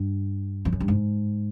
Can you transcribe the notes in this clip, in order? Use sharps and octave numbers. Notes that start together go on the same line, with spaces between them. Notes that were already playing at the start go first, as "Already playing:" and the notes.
Already playing: G2
F2
F#2
G2
G#2